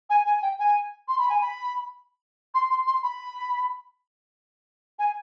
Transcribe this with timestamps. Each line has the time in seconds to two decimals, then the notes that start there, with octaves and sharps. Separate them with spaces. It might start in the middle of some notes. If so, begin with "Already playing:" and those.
0.10 G#5
0.26 G#5
0.42 G5
0.59 G#5
1.08 C6
1.19 B5
1.29 G#5
1.41 B5
2.55 C6
2.70 C6
2.87 C6
3.03 B5
4.99 G#5